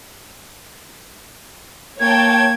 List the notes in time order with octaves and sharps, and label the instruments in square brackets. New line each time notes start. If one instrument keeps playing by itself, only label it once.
[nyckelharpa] A#3 [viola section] C#5 G5 A5 [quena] G#6